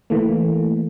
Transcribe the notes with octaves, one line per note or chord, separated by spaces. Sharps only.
E3 A3 A#3